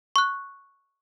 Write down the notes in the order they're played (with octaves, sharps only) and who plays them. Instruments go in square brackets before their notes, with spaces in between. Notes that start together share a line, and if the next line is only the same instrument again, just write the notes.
[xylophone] C#6 F#6